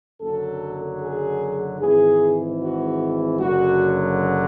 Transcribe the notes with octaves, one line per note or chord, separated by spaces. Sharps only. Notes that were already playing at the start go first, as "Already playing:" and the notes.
F#1 F#2 D3 F#3 A4
G#4
G#1 G#2 E3 G#4
F#4
F#1 F#2 D3 F#3 F#4